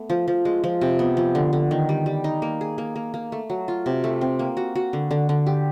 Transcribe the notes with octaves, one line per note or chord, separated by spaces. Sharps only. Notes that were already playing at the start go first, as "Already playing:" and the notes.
Already playing: A3 B3
F3
F3
G#3
F3
C3
B3
F3
D3
D3
D#3
G3
G3
D#4
A#3
G#4
A#3
A#3
A#3
A3
F#3
F4
C3
A3
C4
A#3
F#4
F#4
D3
D3
D3
G4